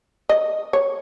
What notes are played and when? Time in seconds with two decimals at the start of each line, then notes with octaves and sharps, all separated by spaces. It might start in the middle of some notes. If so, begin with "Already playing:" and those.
0.29 D#5
0.73 C#5